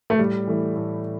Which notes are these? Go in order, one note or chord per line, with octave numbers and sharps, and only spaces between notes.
A3
A2 G3
E3 A3 E4
A2